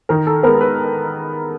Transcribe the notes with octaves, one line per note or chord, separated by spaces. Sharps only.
D#3 A#4
A4
G#3 B3 A#4
B4